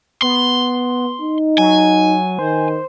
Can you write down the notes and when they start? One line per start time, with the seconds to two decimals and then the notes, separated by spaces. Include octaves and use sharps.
0.22 B3 C6
1.21 D#4
1.58 F#3 G#5
2.39 D#3 C5